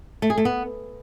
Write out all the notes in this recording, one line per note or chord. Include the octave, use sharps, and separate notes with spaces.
A3
G#4
A3
B3